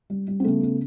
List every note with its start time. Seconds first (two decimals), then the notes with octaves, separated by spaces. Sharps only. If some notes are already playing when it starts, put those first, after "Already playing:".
0.10 G3
0.28 G3
0.40 C4
0.44 C#3 A3 B3
0.63 C#3